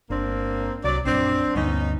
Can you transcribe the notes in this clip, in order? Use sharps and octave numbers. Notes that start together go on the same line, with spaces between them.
G1 A#3 C4 D4
C2 F#3 D5
A#1 F#2 C4 D4
D2 G2 B3 C#4 D#4